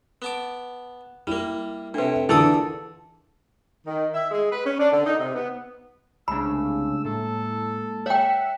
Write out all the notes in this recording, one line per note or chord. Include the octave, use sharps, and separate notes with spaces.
B3 A5 D6
G3 A#3 E4
A2 C3 D4 B4
A#2 D3 E3 G#4 A4 D5 D#6 E6
D#3
E5
G#3
B4
C#4
D4
D3
D#4
C3
B3
C2 C#3 G#3 A3 D4 B5 E6
A2 G#3 A#3 A4 A5
C#5 E5 F#5 G5